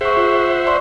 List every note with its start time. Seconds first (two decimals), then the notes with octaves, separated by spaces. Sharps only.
0.01 G#4 C5 E5 F#5 C#6
0.17 F4
0.66 D5 C6 C#6